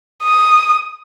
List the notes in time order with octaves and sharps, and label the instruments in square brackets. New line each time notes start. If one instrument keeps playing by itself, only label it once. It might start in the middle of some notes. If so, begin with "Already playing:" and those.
[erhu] D#6